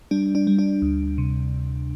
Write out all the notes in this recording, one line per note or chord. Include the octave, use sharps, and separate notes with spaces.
G3 D4
D4
G3
D4
D2
C3